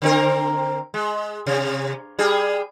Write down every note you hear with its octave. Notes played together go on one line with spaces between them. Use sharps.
D3 C4 A#4
G#3
C3
G3 G#4